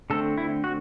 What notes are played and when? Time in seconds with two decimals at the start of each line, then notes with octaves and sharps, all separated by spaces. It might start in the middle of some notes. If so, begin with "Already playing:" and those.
0.10 D3 A3 C4 A4
0.38 E4
0.64 F#4